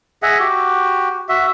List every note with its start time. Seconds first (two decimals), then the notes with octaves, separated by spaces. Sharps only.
0.23 G#4 D#5 E5 F#5
0.40 F#4 G4
1.29 F#4 E5